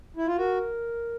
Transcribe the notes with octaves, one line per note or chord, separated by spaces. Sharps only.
E4
F4
F#4 A#4